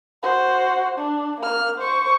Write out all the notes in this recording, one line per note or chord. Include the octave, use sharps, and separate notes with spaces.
F#4 C5
D4
A#3 F6
C5 C#6